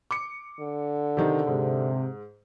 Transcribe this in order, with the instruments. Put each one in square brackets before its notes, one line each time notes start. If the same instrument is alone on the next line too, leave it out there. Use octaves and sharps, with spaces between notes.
[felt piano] D6 C#7
[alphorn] D3
[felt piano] C3 D#3 D#4
[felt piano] G#2 [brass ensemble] C3